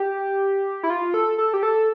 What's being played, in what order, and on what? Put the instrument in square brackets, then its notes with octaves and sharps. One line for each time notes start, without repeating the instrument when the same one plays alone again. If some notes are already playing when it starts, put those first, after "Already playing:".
Already playing: [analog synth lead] G4
E4
F4
A4
A4
G4
A4